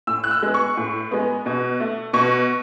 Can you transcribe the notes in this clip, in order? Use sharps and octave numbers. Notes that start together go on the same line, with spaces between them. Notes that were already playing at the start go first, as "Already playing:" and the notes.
A2 E6
F#6
E6
G#3 B3
C#6
A2
G#3 B3
B2
A3
B2 C#6